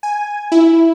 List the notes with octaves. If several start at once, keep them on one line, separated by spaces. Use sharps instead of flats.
G#5
E4